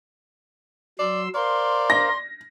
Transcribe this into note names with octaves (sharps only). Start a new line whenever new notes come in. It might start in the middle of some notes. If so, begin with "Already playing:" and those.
F#3 D5 C6 E6
A#4 C5 D5 F5 C6
A#6